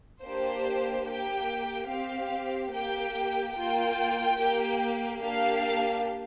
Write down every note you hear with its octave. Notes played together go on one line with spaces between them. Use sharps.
A#3 D4 G4 C5
A#3 G4 G5
C4 G4 F5
A#3 G4 G5
A#3 F4 G5
A#3 G4
A#3 D4 G4 F5